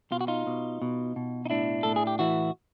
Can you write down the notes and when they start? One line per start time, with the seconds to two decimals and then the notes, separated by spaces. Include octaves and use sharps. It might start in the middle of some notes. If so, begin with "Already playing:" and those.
0.11 B2 F4
0.21 F#4
0.28 D#4 F4
0.47 B2
0.82 B2
1.16 B2
1.46 D#4
1.50 A2 D4 E4
1.83 A2 A4
1.96 G#4
2.07 G4
2.19 E3 E4 F#4